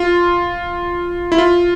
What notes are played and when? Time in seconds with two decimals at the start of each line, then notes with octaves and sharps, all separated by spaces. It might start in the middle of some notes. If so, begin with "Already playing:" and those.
Already playing: F4
1.32 E4
1.38 F4